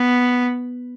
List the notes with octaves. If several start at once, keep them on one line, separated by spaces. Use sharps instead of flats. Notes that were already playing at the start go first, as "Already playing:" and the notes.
Already playing: B3